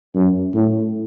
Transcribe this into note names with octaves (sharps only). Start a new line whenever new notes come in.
F#2
A2